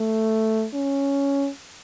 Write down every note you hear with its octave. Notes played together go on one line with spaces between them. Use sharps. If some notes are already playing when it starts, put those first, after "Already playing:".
Already playing: A3
C#4